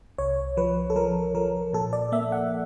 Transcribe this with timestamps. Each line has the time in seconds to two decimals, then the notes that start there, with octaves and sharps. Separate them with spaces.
0.18 C2 C#5
0.57 F3 B4
0.90 A4
0.96 F3 A#4
1.35 F3 A#4
1.73 A#2 A4
1.93 D5
2.12 A#3 E5
2.32 F#5